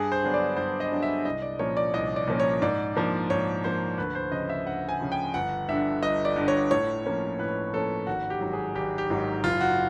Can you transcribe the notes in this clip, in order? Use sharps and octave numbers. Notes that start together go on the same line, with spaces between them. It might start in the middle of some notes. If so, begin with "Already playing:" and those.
Already playing: G2 G#4
C5
D3 F#3 B3 D4
D5
G2 C5
D#5
D3 F#3 B3 D4
E5
C2 D#5
D5
A#2 F3 A#3 C#4 C#5
D5
C2 D#5
D5
A#2 F3 A#3 C#4
C#5
G#2 D5
F3 A#3 D4
G#2 C#5
F3 A#3 D4 C5
D2 B4
C5
C#3 F3 D#5
E5
D2 F#5
G#5
C#3 F3
G5
G1 F#5
G2 D3 E5
G1 D#5
D5
G2 D3
C#5
A2 C#5
F3 A#3 C#4
A2 B4
F3 A#3 C#4 A4
G#1 F#4
G4
G#2 D#3 F#3
G#4
G#1 G4
G4
G#2 D#3 F#3
F#1 F4
F#4